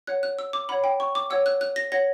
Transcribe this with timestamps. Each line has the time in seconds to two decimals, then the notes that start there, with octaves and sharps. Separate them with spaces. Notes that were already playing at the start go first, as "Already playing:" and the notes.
0.07 C#5 F#5 F#6
0.23 F#6
0.39 E6
0.53 D6
0.69 C#5 F#5 B5
0.84 G5
1.00 C#6
1.15 D6
1.30 C#5 F#5 E6
1.46 F#6
1.61 F#6
1.76 A#6
1.92 C#5 F#5 A#6